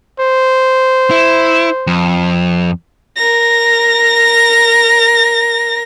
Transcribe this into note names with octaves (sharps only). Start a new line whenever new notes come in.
C5
E4
F2
A#4 A#6